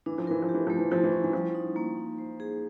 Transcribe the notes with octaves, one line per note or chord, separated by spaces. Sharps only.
E3 D4
F3
E3 A#4
F3
G4
E3
F3 A3
E3
F3 E4
E3
C#4
E3
F3 G3
D#4
A#3
D#4
C5
G#4